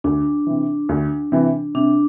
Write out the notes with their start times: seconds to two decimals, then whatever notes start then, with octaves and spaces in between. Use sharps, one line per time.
0.04 D2 D4
0.47 C3 E3
0.89 D2
1.32 C3 E3
1.75 C3 D4